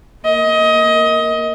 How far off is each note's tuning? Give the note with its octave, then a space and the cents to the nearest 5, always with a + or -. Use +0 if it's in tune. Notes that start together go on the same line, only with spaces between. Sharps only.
A#3 +0 D#5 +20